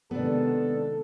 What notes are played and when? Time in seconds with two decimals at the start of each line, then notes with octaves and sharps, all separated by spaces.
0.11 C3 D#3 G#3 B3 D4 A4